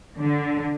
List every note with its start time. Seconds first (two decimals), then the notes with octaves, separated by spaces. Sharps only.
0.19 D3